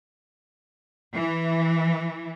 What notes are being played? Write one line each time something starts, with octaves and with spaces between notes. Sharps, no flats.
E3